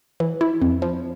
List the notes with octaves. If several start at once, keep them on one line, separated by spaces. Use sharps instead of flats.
E3
E4
F2
F3